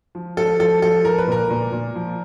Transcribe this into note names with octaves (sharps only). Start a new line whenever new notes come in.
F3
F3 A4
F3 A4
F3 A4
F3 A#4
B4
A#2 A#4
A#2
A#2
F3